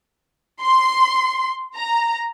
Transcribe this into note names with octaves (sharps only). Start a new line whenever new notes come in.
C6
A#5